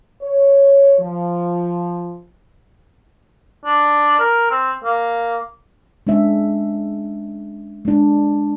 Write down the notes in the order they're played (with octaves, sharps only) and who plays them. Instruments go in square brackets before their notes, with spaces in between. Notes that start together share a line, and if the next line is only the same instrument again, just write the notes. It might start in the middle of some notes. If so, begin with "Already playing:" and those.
[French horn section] C#5
F3
[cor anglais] D4
A#4
C4
A#3
[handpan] G#3 C#4 D4 E5
G#3 D4